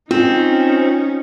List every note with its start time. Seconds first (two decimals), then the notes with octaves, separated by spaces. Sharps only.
0.11 C4 C#4 D#4 F4 G5